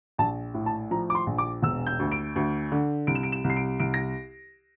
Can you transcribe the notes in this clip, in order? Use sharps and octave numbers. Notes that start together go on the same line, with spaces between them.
A#1 A5
A2
A5
F3 A#5
D6
C6
A#1
D6
E1 E6
G6
D2
D7
D2
D3
C2 D7
E7
D7
E7
C2
C7
D7
C2 D7
A#6